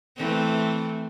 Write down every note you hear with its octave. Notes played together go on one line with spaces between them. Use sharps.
E3 A3 C4